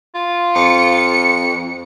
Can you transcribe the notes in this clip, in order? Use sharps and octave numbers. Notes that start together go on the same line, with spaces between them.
F4
F2 C#7